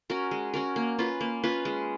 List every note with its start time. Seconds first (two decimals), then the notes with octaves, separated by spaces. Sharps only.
0.10 C#4 F#4 A#4
0.31 G#3
0.54 C#4 F#4 A#4
0.76 A#3
0.98 C#4 F4 B4
1.21 A#3
1.43 C#4 F4 B4
1.65 G#3